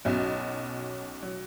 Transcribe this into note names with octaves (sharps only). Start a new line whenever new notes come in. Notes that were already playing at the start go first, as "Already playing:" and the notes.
B1 B2 F#3 C#4
F#3